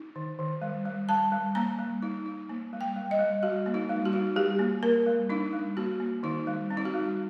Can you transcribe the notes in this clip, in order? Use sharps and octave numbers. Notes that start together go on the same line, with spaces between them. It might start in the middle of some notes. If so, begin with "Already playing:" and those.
Already playing: D#4
D#3
D#3
G3
G3
G3 A5
G3
A#3 A#5
G3
D#4
D#4
A#3
G3
G5
G3
D#5
G3
G3 F#4
A#3
D#4
G3
F#4
D#4
G3 G4
A#3
A#3 A#4
G3
D4 D#4
G3
A#3 F#4
A#3
D#3 D#4
G3
C4
D#4
F#4
G3